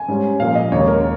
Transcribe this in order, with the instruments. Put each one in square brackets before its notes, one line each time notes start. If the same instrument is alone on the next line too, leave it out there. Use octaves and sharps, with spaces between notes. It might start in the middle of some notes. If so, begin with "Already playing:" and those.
Already playing: [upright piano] G#5
G#2 G3 C#4
A#2 F3 A#3 F5
D#5
D#2 D#3 G#3 C#4 C#5
A#4